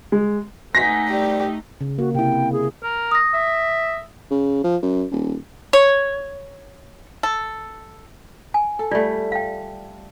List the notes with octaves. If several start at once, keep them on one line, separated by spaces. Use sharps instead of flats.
G#3
A3 D#4 B4 F#5 G#5 A#6 B6
C2 G4 D5
C#3
A#3 F#4
C3 E4 G5
G#4
A#4
D#6 A#6
E5
C#3
F3
F#2
D#1
C#5
A4
G#5
A4
G3 A3 F4 D5
F5 G5